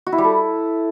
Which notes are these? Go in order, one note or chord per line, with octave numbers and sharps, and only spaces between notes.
F#4
E4
G3
A4